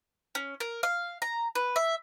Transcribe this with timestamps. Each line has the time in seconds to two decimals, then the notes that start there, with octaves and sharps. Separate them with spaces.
0.35 C#4
0.60 A#4
0.83 F5
1.22 A#5
1.55 B4
1.76 E5